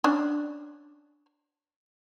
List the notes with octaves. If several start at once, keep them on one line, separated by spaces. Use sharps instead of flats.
C#4 D4